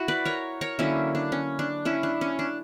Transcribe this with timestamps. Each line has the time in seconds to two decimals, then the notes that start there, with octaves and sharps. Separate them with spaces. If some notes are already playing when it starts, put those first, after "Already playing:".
Already playing: E4 F#4
0.08 B4 D5
0.25 A#4 C#5
0.61 A#4 C#5
0.79 D3 F#3 A#3 C#4 E4
1.15 D4
1.32 C#4
1.59 D4
1.85 C#4 E4
2.03 D4
2.21 C#4
2.39 D4